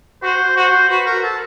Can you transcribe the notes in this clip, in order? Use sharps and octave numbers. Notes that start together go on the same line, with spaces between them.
F#4 C5
F#4 C5
F#4 B4
A#4
A4